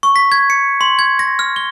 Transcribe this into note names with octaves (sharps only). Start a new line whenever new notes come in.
C#6
B6
G#6
C#7
C6
G#6
A#6
F6
G7